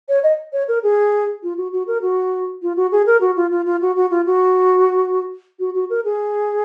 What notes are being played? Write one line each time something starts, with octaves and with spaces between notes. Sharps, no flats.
C#5
D#5
C#5
A#4
G#4
F4
F#4
F#4
A#4
F#4
F4
F#4
G#4
A#4
F#4
F4
F4
F4
F#4
F#4
F4
F#4
F#4
F#4
A#4
G#4